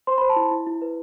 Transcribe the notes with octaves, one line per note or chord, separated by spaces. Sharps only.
C5 C6
B5
C5
A5
E4
E4
E4
B4